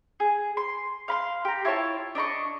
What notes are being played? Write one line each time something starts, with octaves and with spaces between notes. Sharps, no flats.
G#4
C6
F5 B5 C6
G4 A#5
E4 F4 C#5 A5
D4 D#5 A#5 C#6